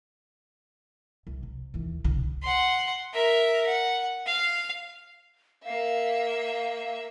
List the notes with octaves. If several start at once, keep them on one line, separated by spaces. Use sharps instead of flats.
C2
C3
D#2 E3
C2 D3
F#5 C6
A#4 E5
F#5
F5
A#3 E5 F5